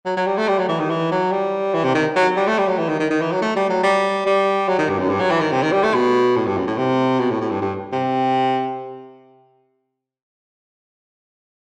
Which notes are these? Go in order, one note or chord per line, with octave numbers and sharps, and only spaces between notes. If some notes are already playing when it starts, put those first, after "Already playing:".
F#3
F#3
G3
A3
G3
F#3
E3
D#3
E3
F#3
G3
E3
C3
D#3
F#3
G3
A3
G3
F#3
E3
D#3
D#3
D#3
E3
F#3
A3
G3
F#3
G3
G3
F#3
D#3
G2
F#2
G2
F#3
E3
D#3
C3
D#3
G3
A3
B2
A2
G2
F#2
A2
C3
B2
A2
A2
G2
G2
C3